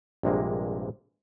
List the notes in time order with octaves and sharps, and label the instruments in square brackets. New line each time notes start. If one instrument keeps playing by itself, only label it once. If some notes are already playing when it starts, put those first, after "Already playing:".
[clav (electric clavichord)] A#1 G2 C3 G#3 A#3